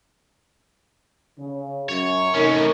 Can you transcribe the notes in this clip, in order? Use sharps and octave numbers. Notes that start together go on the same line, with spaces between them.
C#3
F#2 C#5
A2 C3 C#4 D#4 A#4